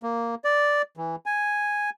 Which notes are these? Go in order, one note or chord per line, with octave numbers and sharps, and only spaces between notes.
A#3
D5
E3
G#5